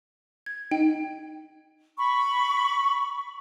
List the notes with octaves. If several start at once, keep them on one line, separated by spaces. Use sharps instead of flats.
G#6
D#4 G5
B5 C#6